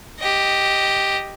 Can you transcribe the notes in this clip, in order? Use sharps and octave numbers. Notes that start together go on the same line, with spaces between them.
G4 D#5